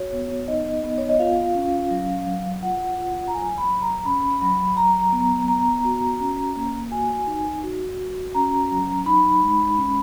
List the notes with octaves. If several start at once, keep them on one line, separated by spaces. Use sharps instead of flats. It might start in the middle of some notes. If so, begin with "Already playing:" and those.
Already playing: F#4 C#5
B3
D#4 D#5
B3
C#5
D#5
F4 F5
C#4
F#3
F#3
F4 F#5
F4
A#5
F#3 G#5
B5
F#3
A#5
C#4 B5
F#3 B5
F#3 A#5
B3
B3 A#5
F#4
C#4
A#3
F#4 G#5
D#4
F#4
F#4
C#4 A#5
F#3
D#4 B5
G#3
C#4